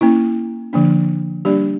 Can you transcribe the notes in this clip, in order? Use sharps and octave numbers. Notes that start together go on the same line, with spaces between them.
A#3 C#4 E4
D3 F3 A#3 D4
G3 A#3 D4 G4 D5